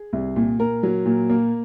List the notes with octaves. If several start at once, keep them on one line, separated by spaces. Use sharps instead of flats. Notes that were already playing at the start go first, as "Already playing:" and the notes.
Already playing: G#4
C2
A#2
A#2 A#4
F#3
A#2
A#3